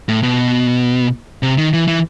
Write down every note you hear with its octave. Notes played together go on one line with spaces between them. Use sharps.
A2
B2
C3
D#3
E3
E3